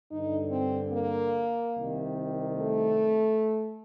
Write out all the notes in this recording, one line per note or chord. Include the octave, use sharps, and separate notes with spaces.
G2 D3 D#4
C4
A#3
C2 C3 D#3
A3